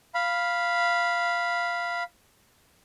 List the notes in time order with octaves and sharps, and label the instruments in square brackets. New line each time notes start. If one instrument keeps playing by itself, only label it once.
[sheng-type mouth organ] F5 B5